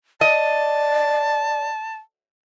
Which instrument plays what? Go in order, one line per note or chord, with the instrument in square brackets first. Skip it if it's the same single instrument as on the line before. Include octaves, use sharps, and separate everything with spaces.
[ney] D5 [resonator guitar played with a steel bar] D#5 [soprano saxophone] A5